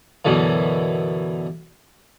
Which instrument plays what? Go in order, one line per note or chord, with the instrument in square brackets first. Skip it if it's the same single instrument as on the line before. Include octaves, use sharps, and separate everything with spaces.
[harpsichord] F#2 B2 D3 E3